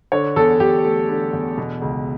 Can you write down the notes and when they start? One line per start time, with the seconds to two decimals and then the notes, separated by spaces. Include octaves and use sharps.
0.12 D3 C#5
0.36 E2 A4
0.60 E2 G4
0.85 A3
1.09 D3
1.33 E2
1.57 B2
1.82 C#2